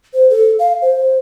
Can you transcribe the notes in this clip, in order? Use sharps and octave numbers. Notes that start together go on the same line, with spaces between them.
C5
A4
F5
C5